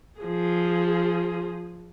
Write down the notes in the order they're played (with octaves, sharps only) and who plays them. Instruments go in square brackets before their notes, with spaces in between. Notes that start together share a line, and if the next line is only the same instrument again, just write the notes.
[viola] F3 G#4